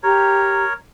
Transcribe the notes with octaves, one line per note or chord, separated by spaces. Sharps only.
G4 A#4 C#5 A#5